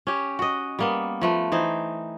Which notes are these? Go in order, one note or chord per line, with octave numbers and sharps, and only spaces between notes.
C#4 G4
F#4 D#5
G3 A#3 B3
F3 A3 B4
E3 D#4 C5